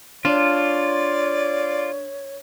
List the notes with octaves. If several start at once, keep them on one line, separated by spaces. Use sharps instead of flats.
D4 F4 C#5 D5